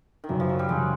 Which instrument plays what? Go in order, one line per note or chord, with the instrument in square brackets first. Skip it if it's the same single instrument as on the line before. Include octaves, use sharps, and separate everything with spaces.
[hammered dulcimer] D#3
[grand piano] F#2 C#3 F#3 [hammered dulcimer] E3
[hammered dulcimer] F3
F#3
G3
[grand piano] F#2 C#3 F#3 [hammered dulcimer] G#3